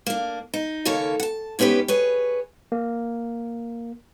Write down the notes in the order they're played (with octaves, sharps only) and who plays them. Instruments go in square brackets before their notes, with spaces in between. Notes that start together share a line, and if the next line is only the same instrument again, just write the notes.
[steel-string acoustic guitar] A#3 D4
D#4
D#2 C#3 A#3 A4 C#5
F#5 A5
G#2 B3 C#4 G4 B4
G#4 B4 C#5
[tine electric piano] A#3